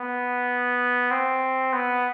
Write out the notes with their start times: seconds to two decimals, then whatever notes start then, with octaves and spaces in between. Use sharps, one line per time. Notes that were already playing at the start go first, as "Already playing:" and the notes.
Already playing: B3
1.11 C4
1.73 B3